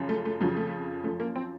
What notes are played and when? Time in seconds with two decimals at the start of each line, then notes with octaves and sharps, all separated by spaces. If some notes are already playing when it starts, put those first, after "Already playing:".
Already playing: F#2 C#3 F3
0.09 A3
0.25 A3
0.40 F2 C#3 F3 F#3
0.57 A3
1.04 F#2 F3 A3
1.20 A#3
1.36 C4